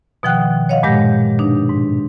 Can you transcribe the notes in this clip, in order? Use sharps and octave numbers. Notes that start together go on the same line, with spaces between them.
B2 D#3 F3 F#5 G5 F#6
C#5 D#5 F5 F#5
G2 A#2 G#3 G4 G6 A#6
B2 D4 D#4
G#2